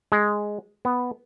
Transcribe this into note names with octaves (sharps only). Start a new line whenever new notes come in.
G#3
B3